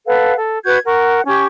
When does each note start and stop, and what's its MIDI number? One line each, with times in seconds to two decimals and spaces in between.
0.06 0.35 69
0.06 0.35 71
0.06 0.35 77
0.06 0.35 78
0.37 0.57 69
0.65 0.78 66
0.65 0.78 71
0.65 0.78 91
0.65 0.78 92
0.85 1.21 70
0.85 1.21 78
0.85 1.21 85
1.27 1.46 61
1.27 1.46 67
1.27 1.46 85
1.27 1.46 92